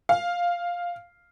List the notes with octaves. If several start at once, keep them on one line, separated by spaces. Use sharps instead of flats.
F5